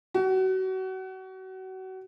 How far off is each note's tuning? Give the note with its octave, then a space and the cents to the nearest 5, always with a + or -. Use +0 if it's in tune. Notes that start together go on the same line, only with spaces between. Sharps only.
F#4 +30